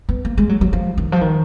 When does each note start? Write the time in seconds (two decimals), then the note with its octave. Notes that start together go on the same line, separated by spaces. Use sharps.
0.09 B3
0.25 A#3
0.37 G#3
0.49 F#3
0.61 F#3
0.73 F3
0.97 D#3
1.12 F3
1.21 D#3